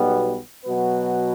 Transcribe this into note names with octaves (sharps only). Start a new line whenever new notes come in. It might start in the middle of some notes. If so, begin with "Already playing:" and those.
Already playing: B1 B2 G3 B3
B2 F#3 B3 F#4 B4